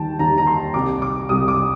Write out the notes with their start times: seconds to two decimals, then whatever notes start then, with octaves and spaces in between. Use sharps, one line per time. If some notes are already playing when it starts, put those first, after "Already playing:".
Already playing: D#2 D#3 G3 G5 A5
0.19 D#2 D#3 G3 A#5
0.38 A#5
0.47 C6
0.74 C2 C3 G3 D6
1.02 D6
1.29 C2 C3 G3 D#6
1.48 D6